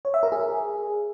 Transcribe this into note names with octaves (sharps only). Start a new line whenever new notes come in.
C#5
E5
A#4
G#4